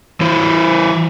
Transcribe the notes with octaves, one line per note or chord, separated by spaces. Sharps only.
E3 E4 C5